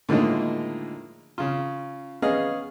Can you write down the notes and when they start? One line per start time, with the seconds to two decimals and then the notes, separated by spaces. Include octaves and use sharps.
0.09 A2 D3 D#3 F3 G#3 A#3
1.38 C#3 F4
2.22 B3 C#4 G#4 D#5 F5